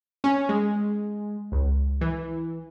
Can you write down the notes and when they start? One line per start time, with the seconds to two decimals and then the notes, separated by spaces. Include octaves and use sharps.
0.24 C#4
0.49 G#3
1.52 C#2
2.01 E3